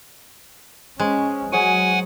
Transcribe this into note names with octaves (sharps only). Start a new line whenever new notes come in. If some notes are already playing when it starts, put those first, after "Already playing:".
G#3 C#4 C5
F#3 G#4 C5 C#5 F#5 G#5